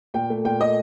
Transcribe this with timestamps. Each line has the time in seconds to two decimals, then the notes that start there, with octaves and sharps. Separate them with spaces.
0.14 A#2 G5
0.30 A3
0.45 A#2 G5
0.60 A3 D#5